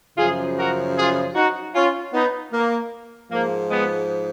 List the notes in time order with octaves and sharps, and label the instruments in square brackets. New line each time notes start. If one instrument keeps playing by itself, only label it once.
[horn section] F#2 C#3 F3 F4 G#4
F#4 A#4
F4 G#4
D#4 F#4
C#4 F4
B3 D#4
A#3
G#2 F3 A#3
G#3 B3